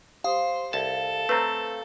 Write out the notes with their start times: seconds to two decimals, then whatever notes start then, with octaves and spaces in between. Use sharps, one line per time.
0.24 G4 C5 F5 D#6
0.73 C2 A4 A5
1.29 A3 C4 B4 C#5 A#5